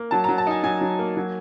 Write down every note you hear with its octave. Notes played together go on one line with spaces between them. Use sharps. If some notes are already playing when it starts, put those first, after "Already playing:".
Already playing: A#3
F#3 A5
F#3 A#5
A5
D#4 G#5
F#3 G#5
F#3
A#3
F#3